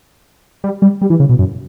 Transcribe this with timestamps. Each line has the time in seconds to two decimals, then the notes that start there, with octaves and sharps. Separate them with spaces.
0.64 G3
0.82 G3
1.02 G3
1.10 E3
1.20 C#3
1.29 B2
1.39 F#2